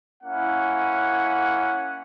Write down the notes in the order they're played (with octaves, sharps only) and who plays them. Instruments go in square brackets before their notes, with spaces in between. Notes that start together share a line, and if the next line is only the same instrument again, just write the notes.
[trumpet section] A#3 C#4 E4 F#5